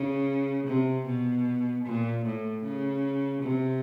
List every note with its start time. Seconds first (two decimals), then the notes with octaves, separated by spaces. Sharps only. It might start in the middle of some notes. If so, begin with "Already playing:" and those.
Already playing: C#3
0.67 C3
1.06 B2
1.85 A#2
2.26 A2
2.64 C#3
3.43 C3